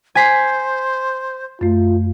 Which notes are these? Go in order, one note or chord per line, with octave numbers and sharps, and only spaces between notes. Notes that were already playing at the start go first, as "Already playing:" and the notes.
C5 G#5 B6 C7
F#2 A3 F4